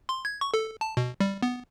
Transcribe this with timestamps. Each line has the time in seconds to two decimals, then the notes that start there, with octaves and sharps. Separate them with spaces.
0.09 C6
0.25 G#6
0.41 C#6
0.54 A4
0.81 A5
0.97 B2
1.20 G3
1.43 B3